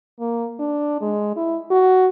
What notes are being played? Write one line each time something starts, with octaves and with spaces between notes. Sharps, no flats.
A#3
D4
G#3
E4
F#4